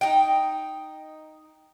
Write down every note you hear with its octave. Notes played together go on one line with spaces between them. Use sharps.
D#4 G5